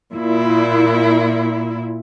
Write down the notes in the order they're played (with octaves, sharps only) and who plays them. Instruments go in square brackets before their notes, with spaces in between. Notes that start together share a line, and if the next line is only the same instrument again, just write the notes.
[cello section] A#2 E4